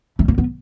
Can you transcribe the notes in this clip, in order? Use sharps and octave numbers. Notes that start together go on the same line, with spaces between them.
A3
A#3
B3